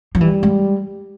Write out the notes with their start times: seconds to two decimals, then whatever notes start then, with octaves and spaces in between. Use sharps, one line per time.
0.15 F3
0.21 E3 G3
0.43 G#3